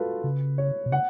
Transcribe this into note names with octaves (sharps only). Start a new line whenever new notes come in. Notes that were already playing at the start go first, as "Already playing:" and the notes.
Already playing: F4 F#4 A4 B4
C#3
C#5
B2
C#3 F#5